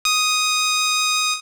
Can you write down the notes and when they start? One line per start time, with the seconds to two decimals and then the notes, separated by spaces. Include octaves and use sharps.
0.05 D#6